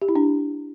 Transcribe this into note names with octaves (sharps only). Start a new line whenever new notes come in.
G4
E4
D4